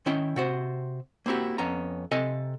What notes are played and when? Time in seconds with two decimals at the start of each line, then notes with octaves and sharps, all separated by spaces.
0.06 D#3 C#4 E4 G5
0.36 C3 F#4 C5
1.26 A#3 C4 E4 F#4 G4
1.58 F2 B3 C#4 A#5
2.11 C3 A4 D#5 F5 G#5